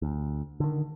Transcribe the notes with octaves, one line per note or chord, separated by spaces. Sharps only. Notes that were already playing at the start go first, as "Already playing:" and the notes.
D2
D3 D#3